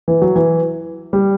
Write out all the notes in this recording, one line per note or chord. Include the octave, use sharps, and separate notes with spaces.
E3
F#3
E3
G3